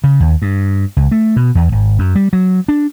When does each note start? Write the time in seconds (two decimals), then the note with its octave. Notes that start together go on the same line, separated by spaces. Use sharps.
0.04 C#3
0.20 D#2
0.42 G2
0.97 C#2
1.12 A3
1.36 B2
1.55 E2
1.72 G#1
1.99 F#2
2.15 G3
2.33 F#3
2.68 D4